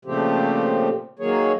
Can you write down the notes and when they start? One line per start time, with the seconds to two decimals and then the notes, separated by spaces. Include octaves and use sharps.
0.05 A#2 C#3 F3 A3 C4 G4
1.19 D#3 F#3 A#3 G#4 C#5